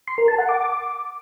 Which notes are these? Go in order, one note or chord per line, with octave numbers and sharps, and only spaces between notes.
C6
A#4
A5
F#5
D6